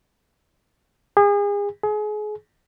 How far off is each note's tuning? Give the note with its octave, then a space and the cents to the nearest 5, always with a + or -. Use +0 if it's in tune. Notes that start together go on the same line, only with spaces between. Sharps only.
G#4 -35
G#4 +30